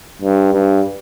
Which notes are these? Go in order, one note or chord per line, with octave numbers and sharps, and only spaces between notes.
G2
G2